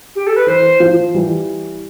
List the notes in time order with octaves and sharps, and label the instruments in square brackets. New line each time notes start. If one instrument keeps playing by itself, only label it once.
[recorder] G4
A4
B4
[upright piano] E3 [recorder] C5
[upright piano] F3
E3 G3